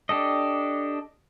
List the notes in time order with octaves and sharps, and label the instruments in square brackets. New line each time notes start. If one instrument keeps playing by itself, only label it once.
[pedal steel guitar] D4 G4 A4 D#5